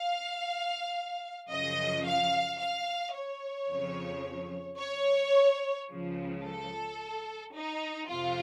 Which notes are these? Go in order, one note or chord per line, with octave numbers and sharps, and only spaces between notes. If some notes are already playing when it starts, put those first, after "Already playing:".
Already playing: F5
F#2 C#3 F3 D#5
F5
F5
C#5
F2 C#3 F3
C#5
C#2 C#3 F3
A4
D#4
F2 C3 F4